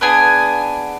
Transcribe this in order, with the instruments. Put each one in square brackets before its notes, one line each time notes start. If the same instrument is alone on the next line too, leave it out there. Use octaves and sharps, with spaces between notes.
[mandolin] B3 D4 G#4 G#5